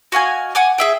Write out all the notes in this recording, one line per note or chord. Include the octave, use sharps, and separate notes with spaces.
F#4 D#5 F5 G#5
F#5 G#5 D6
G#4 E5 G5